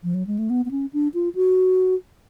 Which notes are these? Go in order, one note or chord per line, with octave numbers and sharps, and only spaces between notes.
F3
F#3
G#3
A3
B3
B3
C#4
D4
F4
F#4